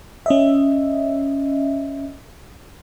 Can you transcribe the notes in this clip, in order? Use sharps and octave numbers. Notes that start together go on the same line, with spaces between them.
C#4 D#5 E5